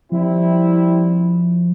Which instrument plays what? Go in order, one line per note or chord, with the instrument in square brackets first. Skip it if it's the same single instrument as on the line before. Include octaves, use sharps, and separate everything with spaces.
[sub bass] F3 [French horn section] G3 C4 E4